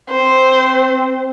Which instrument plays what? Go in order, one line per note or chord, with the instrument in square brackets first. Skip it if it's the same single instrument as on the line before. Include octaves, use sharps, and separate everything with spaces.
[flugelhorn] C4 [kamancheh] C5